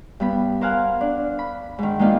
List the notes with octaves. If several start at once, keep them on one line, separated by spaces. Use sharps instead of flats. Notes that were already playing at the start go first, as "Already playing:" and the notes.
G2 B3 B5
A#4 C5 F5 F#5 G#5
D4
B5
G#2 D#3
G#3 A#3 B3 D4 D#4 F4